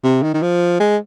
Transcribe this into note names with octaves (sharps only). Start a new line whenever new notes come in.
C3
D#3
D#3
F3
G#3